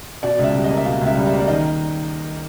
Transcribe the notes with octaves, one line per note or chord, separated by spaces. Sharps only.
B2 D5
C#2
E5
G3
D#5
A#3
E5
B2 F5
C#2
E5
G3
E5
A#3
D5
D#3 D#5